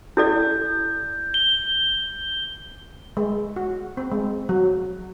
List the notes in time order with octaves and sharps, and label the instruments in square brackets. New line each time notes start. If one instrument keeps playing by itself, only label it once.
[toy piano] E4 A4 D5 [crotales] G6
[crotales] G7
[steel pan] G#3
F#4
C4
G#3
F#3